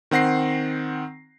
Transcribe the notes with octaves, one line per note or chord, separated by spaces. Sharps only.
D#3 C4 F#5 A#6 C7